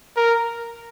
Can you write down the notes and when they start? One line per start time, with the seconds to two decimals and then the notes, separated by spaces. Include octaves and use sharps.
0.16 A#4